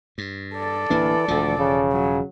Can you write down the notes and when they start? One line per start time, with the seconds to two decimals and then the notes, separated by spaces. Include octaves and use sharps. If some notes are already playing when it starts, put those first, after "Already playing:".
0.18 G2
0.55 A4 D5
0.90 D1 E3 A#3 D4
1.28 E1 D2 F3
1.59 C#3
1.92 F#3